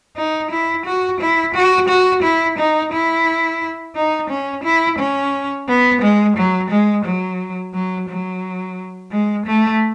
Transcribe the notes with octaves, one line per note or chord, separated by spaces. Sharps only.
D#4
E4
F#4
E4
F#4
F#4
E4
D#4
E4
D#4
C#4
E4
C#4
B3
G#3
F#3
G#3
F#3
F#3
F#3
G#3
A3